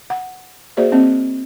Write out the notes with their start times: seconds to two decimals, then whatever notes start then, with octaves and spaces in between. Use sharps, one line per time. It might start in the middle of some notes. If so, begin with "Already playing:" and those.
0.10 F#5
0.77 A#3 F#4 G#4 C5 D5 E5
0.92 A#3 C4 D#5